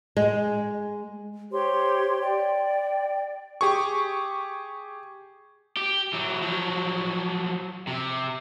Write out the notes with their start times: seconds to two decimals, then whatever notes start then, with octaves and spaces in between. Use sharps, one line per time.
0.17 G#3
1.51 G4 C5 C#5 C6
2.21 D5 G5
3.61 G4 G#4 C#6
5.77 G4
6.13 E3 F#3
6.42 F3 F#3
7.87 C3